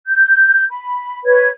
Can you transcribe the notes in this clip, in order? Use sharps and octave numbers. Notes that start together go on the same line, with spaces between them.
G6
B5
B4 C#5 G#6